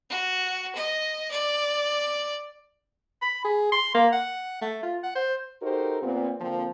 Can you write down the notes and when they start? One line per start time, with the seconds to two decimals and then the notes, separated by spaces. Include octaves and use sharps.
0.10 F#4
0.76 D#5
1.31 D5
3.22 B5
3.45 G#4
3.72 C6
3.95 A#3
4.13 F#5
4.62 A3
4.83 F4
5.04 F#5
5.16 C5
5.62 D#4 F#4 G4 A4 A#4 C5
6.02 A#2 B3 C4
6.40 D3 F3 A#3 C4